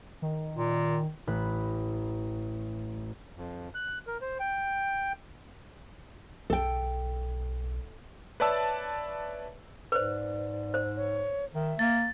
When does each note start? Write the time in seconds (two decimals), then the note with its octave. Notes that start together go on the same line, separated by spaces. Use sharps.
0.22 D#3
0.55 A#2
1.27 A1 B5 F#6
3.36 F2
3.75 F#6
4.07 A#4
4.21 C5
4.40 G5
6.50 B1 A4 G5
8.40 B4 C#5 D5 E5 A5 E6
9.92 G#2 B4 C5 D5
10.74 C5
10.96 C#5
11.55 D#3 E5
11.79 A#3 A6